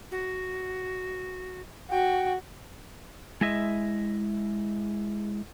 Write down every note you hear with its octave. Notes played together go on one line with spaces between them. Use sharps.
F#4
F#4 G5
G#3 E4 D#5 E5